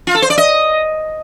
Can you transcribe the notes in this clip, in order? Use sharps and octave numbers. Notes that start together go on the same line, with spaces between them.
F4
A4
C5
D5
D#5